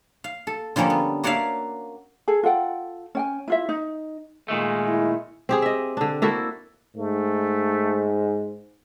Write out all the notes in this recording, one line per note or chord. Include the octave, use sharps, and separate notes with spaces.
F5
A4
D3 F3 G3 A#3 C#4 A4
B3
A#3 F#4 C#5 D5 E5 F5
G#4 A4
F4 A4 F#5 G5
C#4 G5 G#5
E4 F4 E5
D#4
A#2 D#3 G#3 A3
E4
C4 G4 G#4
D#5 E5
D3 D4
A#3 E4 F#4 A4
G#2 A3